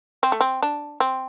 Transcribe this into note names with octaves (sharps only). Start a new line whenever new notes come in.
C4
A3
C4
D4
C4